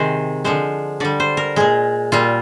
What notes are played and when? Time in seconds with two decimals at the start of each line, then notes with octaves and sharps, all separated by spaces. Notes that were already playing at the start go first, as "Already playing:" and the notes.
Already playing: C3 D#3 G#3 C5
0.44 D3 F3 G#3 C5
1.00 D3 G3 D5
1.20 C5
1.37 A#4
1.56 A#2 G#3 G#4
2.12 A#2 G3 F4